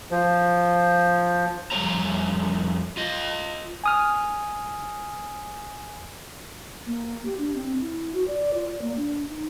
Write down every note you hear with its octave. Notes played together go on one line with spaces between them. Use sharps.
F3
F2 G3 A3 C#5 A#5
F4 D#5
G#5 D#6 F6
A#3
G4
D4
C4
E4
F#4
D5
F4
D5
A#3
D4
D#4